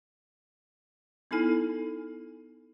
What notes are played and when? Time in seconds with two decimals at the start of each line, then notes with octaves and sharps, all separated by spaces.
1.31 B3 D#4 E4 A4 G#5